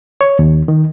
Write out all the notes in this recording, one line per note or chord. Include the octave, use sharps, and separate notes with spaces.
C#5
D#2
D#3